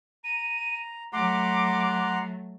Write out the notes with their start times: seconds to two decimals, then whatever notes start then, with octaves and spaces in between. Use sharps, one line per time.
0.24 A#5 D#7
1.13 F#3 A3 F#5 A#5 C6 D6